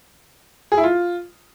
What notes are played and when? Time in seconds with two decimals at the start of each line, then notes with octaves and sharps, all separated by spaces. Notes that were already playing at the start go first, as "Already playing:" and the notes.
0.72 G#4
0.78 E4
0.83 F4